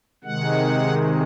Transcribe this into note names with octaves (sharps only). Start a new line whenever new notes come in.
C3 D#3 G#3 F#5